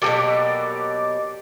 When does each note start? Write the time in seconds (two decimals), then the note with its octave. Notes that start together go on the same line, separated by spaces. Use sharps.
0.02 B2 F#3 A#3 G4 A4 D5